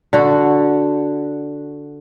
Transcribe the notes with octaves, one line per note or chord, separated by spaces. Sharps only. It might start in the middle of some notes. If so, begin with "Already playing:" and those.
D3 F#4